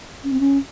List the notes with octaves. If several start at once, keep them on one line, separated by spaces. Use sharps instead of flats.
C#4
C4
C#4